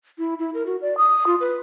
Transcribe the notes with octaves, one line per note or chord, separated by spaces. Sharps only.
E4
E4
A#4
F#4
D5
D#6
F4
B4